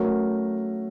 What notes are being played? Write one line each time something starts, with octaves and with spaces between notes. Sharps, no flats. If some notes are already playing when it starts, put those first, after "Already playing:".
Already playing: F#3 A3 C#4 F#4 A#4